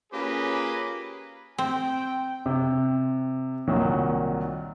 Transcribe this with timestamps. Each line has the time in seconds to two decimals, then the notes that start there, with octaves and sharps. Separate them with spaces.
0.13 A#3 C#4 F4 G4 G#4 B4
1.58 C4 G5
2.46 C3
3.67 C2 A#2 D#3 F#3